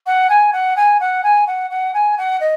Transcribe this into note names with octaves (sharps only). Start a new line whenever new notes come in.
F#5
G#5
F#5
G#5
F#5
G#5
F#5
F#5
G#5
F#5
D#5